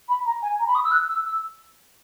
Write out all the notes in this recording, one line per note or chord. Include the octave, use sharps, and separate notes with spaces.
B5
A#5
G#5
A#5
B5
D#6
E6
F#6
E6
E6